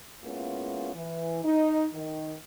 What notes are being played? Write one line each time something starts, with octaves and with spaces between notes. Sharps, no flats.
G#3 A#3 B3 C#4 E4 F4
E3
D#4
D#3